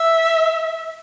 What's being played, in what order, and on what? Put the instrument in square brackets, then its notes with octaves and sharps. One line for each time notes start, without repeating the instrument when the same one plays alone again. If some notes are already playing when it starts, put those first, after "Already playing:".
Already playing: [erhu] E5